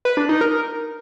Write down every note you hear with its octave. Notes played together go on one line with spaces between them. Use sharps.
B4
D4
D#4
A#4